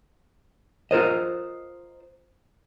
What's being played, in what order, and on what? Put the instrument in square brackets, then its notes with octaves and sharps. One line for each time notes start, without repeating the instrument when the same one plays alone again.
[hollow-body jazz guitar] F4 A#4 C5 D#5